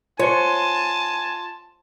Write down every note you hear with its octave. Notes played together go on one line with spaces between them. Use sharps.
F4 C#5 G#5 A5 C6